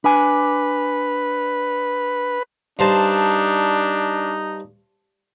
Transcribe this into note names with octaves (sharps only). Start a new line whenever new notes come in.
D4 B4 G#5
G2 D4 D#4 C5 A5